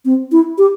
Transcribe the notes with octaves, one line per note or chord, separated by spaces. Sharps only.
C4
E4
G4